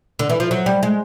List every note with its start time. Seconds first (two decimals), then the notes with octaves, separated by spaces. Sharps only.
0.19 D3
0.29 E3
0.40 F3
0.51 F#3
0.66 G3
0.83 G#3